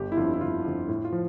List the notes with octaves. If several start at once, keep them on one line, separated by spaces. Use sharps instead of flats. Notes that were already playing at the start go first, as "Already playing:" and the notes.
Already playing: G1 G4
E4
F2 D3 F4
E4
G1 F4
F2 D3
A2
F4
F3